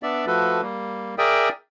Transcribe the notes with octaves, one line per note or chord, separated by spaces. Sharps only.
B3 D4 D5 E5
F3 A3 F#4 A4 B4
G3 A#3
G#4 A#4 D5 E5 G5 D#6